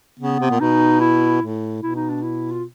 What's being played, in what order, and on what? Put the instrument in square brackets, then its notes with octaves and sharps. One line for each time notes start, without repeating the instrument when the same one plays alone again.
[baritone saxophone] C#3 [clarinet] B3
[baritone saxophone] C3
A#2
[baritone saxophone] B2 [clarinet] D#4
[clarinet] E4
[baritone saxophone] A2
[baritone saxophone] B2 [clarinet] E4
[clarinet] D#4
D4
E4
F4